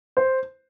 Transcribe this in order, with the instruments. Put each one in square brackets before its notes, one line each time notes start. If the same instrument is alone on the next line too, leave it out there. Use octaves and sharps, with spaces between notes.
[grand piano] C5